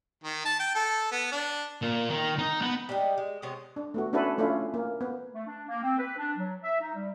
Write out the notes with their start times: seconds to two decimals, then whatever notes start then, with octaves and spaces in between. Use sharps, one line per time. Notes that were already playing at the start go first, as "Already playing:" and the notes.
0.24 D#3
0.45 A5
0.59 G5
0.75 A4
1.12 B3
1.32 D4
1.82 A#2
2.10 D#3
2.38 D#4
2.62 B3
2.89 G3 G#3 B3 D#4
3.18 G#3
3.42 C3 G#3 B3 C#5
3.76 D4
3.94 A3 B3 F#4
4.13 C#4 D4 E4 F#4 A4 B4
4.38 A3 C#4 D4 E4 F4
4.74 A#3
5.01 B3
5.34 A3
5.47 D4
5.68 A#3
5.82 C4
5.98 B4
6.18 D4
6.37 F#3
6.63 E5
6.80 D#4
6.95 G3